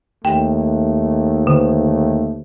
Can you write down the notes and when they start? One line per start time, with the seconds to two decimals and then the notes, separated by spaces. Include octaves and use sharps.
0.25 D#2 A3 G5
1.47 D3